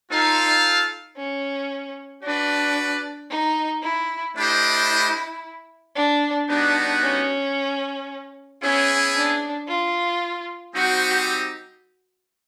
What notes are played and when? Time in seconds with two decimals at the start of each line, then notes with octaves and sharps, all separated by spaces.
0.11 D#4 F4 A4 C5 F5
1.17 C#4
2.23 D4 F#4 B4 D5
3.30 D#4
3.83 E4
4.37 A3 D4 E4 G4 C5 D#5
5.96 D4
6.49 G3 B3 D4 D#4 F#4
7.03 C#4
8.62 B3 C#4 E4 G#4
9.15 D4
9.68 F4
10.75 G3 C4 D#4 F#4 G4 C5